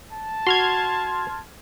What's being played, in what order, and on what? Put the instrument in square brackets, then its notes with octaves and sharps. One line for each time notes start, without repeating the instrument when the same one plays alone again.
[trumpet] A5
[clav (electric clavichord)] F#4 [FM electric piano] C6 F6 G#6